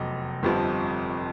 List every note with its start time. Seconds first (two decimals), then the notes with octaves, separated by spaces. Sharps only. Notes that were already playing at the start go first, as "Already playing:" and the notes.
Already playing: F1 E2 F#3 D#5
0.43 G1 F2 C3 F3